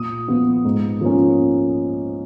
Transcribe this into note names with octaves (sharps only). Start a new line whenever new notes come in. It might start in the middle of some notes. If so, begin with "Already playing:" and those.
Already playing: A#2 D#6
F3 B3 F4
G#2
F3 A#3 C#4